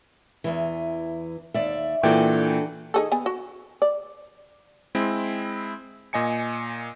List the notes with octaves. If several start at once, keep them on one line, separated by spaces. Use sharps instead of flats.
E2 E3
D#2 D5 E5
A#2 E3 D4 F#4 A4 G5
D#4 G#4 A4
B3 G#5
F#4
D5
G#3 C4 E4
A#2 D#5 G#5 C#7